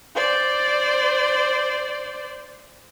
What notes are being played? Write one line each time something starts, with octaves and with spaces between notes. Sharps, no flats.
C5 D5